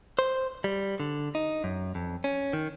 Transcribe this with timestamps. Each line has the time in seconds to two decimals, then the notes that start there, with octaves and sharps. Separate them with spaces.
0.19 C5
0.64 G3
1.00 D3
1.35 D#4
1.64 F#2
1.95 F2
2.24 C#4
2.53 D#3